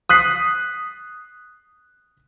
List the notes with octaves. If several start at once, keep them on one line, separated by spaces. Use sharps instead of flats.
D#6 F#6 B6 C7